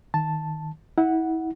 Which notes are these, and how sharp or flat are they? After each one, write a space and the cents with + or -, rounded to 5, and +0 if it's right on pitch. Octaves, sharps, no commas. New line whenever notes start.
D#3 +0 A5 +0
E4 -30 F#5 +0